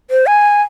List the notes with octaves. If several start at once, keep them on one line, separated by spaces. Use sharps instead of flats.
C5
G#5